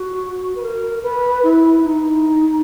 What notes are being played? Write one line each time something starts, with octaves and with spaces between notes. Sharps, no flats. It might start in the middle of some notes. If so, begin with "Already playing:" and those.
Already playing: F#4
B4
A#4
B4
E4
D#4